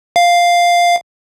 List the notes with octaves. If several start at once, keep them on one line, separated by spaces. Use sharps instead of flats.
F5